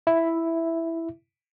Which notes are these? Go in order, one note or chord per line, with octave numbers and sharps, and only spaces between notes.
E4 E5